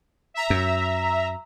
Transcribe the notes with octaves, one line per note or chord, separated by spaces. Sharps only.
E5 A#5
F#2